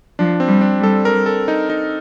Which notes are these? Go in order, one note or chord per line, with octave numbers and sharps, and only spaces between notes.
F3 D4
C4
G3
D4
G3
A4
A#4
A4
D#4
D#4